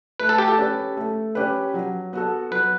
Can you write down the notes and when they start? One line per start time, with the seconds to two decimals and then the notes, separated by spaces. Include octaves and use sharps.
0.20 A3 B4
0.29 A4
0.38 G4
0.48 A4
0.58 C#4 G4 B4
0.97 A3
1.35 C#4 G4 B4
1.74 F#3
2.13 B3 F#4 A4
2.51 F#3 B4